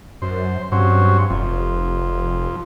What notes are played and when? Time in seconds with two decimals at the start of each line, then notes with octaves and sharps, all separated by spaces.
0.22 F#2 C5
0.72 G2 F#3 C4 C#4
1.30 F1 F2